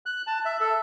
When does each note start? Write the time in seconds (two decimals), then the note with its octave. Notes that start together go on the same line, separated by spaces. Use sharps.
0.06 F#6
0.27 A5
0.45 E5
0.60 A4